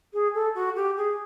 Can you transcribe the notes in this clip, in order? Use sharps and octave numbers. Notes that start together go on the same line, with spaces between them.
G#4
A4
F#4
G4
G#4